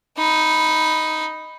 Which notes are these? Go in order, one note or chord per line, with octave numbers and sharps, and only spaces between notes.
D#4 B5